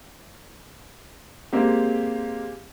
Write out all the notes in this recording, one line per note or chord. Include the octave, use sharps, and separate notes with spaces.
G#3 A#3 C4 G4